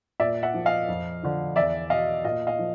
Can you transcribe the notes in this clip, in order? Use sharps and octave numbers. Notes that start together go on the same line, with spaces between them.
A#2 D5 E5
E5 F#5
F3
D#5 F5
F2
D3 F3
E2 D5 E5
B2 D#5 F5
A#2 D#5 F5
D#5 F5
F3